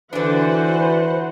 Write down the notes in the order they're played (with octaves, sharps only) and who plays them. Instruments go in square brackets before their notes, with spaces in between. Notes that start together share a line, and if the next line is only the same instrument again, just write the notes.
[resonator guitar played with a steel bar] D3 D4 [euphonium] E3 [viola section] F#4 C5 F#5 [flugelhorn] B4